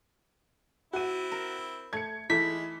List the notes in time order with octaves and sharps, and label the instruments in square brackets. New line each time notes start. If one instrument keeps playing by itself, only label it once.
[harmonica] C4 E4 [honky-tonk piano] F#4 D#7
[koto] A#4
[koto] A3 [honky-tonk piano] G#6 C#7
[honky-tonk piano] E3 [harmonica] G#3 B5 [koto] A3 D#4 E5 [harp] B6